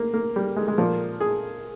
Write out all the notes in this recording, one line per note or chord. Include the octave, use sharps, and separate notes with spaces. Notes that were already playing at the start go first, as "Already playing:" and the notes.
Already playing: A#3
A#3
G3
G#3
G#3
A#2 F3 A#3
G#4